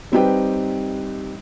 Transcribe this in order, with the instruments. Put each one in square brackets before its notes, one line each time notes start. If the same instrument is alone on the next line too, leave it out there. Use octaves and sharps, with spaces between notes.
[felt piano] G3 C4 D#4 G4 B4 G5